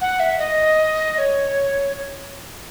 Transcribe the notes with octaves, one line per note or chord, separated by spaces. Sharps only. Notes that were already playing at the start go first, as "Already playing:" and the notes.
F#5
E5
D#5
D#5
C#5